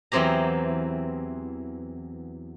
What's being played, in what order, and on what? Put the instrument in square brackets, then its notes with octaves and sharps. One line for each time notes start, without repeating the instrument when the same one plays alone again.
[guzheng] E2 E3 F#3 C4 G4 A#5